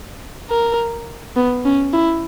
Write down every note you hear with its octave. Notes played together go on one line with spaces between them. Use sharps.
A#4
B3
C#4
E4